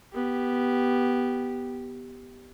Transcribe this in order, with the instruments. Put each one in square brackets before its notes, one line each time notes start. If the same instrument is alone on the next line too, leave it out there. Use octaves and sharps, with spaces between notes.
[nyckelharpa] B3 G4